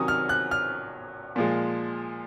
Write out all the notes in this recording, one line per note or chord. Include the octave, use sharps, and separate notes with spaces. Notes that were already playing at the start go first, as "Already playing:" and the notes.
Already playing: C3 D#3 F#3 C#4 D#6
F6
F#6
F6
A#2 F3 G#3